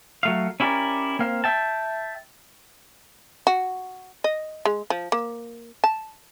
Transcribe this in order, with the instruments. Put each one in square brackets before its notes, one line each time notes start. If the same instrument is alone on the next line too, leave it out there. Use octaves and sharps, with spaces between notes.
[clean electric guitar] F#3 A3 F5
C#4 E4 G4 A4 A#4 D5
A#3 C4 F5
E5 G5 A5
[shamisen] F#4
D#5
G#3
F3
A#3
A5